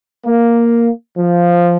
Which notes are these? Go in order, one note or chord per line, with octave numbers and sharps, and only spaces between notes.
A#3
F3